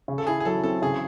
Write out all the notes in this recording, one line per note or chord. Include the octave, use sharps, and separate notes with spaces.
C#3
A4
E4 G#4
G#4
F#3 A4
C4 A4
C#3 G#4